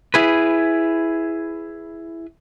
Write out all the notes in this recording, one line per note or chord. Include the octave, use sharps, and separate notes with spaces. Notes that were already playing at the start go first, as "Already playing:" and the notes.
E4 G#4 B4